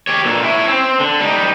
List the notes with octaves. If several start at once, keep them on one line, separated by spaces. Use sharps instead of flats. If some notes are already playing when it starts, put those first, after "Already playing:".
G4 C#5
A#2 D3
E4 C#5
C4
D3
G3 D#4